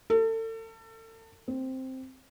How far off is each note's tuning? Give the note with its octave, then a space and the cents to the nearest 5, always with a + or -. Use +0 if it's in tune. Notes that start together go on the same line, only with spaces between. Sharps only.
A4 +35
C4 +0